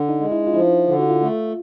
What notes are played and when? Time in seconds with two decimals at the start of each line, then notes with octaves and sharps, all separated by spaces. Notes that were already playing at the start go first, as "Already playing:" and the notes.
Already playing: D3 D4
0.09 D#4
0.20 G#3
0.32 E4
0.47 F4
0.54 F3 E4
0.87 D3 F4
0.99 F#4
1.09 F4
1.22 A3